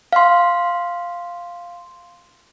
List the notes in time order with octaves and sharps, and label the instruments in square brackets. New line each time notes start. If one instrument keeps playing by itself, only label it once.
[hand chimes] F5 C6